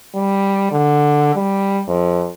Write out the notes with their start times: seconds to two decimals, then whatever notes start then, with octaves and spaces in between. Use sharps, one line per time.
0.15 G3
0.72 D3
1.35 G3
1.88 F2